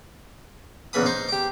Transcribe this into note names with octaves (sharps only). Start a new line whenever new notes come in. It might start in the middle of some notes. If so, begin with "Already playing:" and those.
A#1 E2 C#3 E3 B5 D#6
D#4 C5
G4 D6